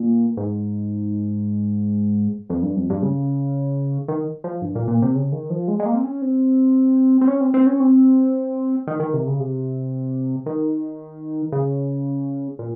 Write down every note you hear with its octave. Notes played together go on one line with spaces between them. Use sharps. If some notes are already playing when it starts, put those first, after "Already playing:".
Already playing: A#2
G#2
F2
G2
F2
G2
C#3
D#3
F3
G2
A#2
A#2
C3
C#3
D#3
F3
G#3
G#3
A#3
C4
C#4
C4
C4
C#4
C4
C4
C#4
C4
D#3
D#3
C3
C#3
C3
D#3
C#3
A#2